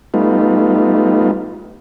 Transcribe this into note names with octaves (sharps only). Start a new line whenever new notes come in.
G3 A3 B3 D#4 F4